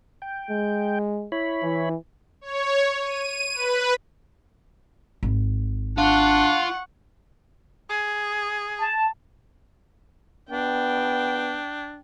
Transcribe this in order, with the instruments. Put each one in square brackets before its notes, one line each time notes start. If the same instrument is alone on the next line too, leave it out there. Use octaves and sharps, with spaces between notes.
[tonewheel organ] G5
[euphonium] G#3
[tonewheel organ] E4 C#5 B5
[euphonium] E3
[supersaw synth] C#5
D#7
B4
[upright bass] G#1
[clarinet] D4 [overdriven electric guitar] F4 [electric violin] F#5 C#6
[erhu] G#4
[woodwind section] A5
[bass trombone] B3 [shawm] D4 [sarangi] G5